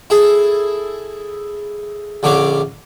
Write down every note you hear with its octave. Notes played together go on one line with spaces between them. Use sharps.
E4 G#4 A4
A#1 D3 C#4 C#5 D6